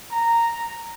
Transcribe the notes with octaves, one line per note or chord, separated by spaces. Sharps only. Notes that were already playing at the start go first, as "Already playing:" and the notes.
A#5